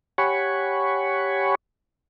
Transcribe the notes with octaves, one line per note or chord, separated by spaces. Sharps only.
G4 C#5 F#5 G#5 B5 C#6